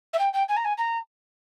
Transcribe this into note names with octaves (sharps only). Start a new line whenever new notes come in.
E5
G5
G5
G#5
A#5
G#5
A#5